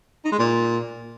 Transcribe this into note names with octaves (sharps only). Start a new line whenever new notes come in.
D#4
G#3
A#2